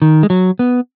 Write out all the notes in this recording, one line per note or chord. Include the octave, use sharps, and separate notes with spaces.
D#3
G#3
F#3
B3